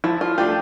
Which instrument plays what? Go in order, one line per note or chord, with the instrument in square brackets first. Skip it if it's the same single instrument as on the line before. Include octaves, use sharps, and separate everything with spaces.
[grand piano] F3 [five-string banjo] E4
[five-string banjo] F4
[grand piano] A3 D4 F4 [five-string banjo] G4